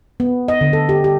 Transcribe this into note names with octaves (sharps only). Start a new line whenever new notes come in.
B3
D#5
D3
A4
G4
G4